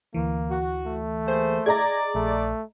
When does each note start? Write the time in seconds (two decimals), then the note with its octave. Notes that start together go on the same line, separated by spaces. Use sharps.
0.14 D2 E3 A#3
0.50 F#4
0.86 A3
1.27 A#3 G#4 C5
1.66 G#4 D5 D#5 A#5 G#6 A#6
2.15 A#1 A3